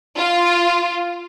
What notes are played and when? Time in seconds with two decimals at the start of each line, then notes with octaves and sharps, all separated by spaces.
0.16 F4